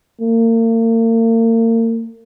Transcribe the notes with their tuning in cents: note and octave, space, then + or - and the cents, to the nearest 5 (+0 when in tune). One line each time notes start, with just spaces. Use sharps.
A#3 -40